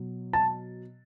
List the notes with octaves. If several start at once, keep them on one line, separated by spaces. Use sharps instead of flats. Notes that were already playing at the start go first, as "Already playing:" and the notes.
Already playing: B2 F#3
A5